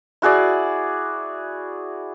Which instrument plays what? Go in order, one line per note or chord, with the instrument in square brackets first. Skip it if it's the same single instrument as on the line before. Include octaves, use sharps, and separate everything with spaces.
[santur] E4 F#4 G#4 D5